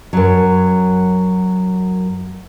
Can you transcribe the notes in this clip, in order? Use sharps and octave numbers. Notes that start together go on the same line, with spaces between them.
F#2 F#3